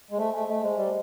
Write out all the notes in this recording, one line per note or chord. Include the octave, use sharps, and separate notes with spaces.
G#3
A3 C5
A3 G#5
A3 D#5
G#3 C5
G3 C5